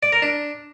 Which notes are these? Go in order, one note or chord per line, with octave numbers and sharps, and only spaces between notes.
D5
A#4
D4